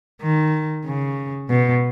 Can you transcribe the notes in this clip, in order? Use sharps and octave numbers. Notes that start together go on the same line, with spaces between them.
D#3
C#3
B2